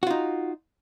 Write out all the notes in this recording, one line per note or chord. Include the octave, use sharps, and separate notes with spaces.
D#4 F4 F#4